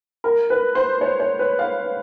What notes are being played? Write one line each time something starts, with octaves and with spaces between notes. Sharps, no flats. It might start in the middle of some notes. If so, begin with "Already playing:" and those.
A#4
B4
C5
C#5
C#5
B4
F5